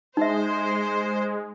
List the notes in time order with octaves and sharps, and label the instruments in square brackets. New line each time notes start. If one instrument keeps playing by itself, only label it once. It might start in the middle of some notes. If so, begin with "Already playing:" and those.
[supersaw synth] G#3 [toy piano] D#4 E5 [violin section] C5